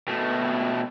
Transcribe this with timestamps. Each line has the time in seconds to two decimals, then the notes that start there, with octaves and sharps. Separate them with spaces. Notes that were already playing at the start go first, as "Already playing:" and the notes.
0.08 B2 A3